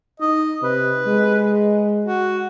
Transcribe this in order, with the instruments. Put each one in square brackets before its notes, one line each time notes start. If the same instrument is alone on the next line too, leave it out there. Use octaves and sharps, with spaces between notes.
[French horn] D#4 [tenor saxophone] D#5
[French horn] C3 [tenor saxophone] B4
[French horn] G#3
[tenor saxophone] F#4